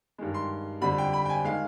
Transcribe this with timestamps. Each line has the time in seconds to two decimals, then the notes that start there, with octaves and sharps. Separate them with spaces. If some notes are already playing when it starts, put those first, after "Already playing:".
0.18 G2 D#3 G#3
0.34 C6
0.81 F2 D3 G3 B5
0.98 G5
1.13 B5
1.25 G5
1.29 G#5
1.44 D#3 G#3 F5